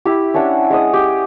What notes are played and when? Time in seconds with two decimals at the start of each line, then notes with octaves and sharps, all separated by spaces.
0.05 E4 G4
0.34 C#4 D4 E5 F#5
0.70 G#3 D#5 D#6
0.94 G4